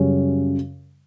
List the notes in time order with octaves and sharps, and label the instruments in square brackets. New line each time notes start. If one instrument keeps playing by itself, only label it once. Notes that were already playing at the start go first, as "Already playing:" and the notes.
Already playing: [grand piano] F#2 C#3 G3 C#4